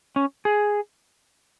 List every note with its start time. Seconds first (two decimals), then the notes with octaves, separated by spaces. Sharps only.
0.16 C#4
0.45 G#4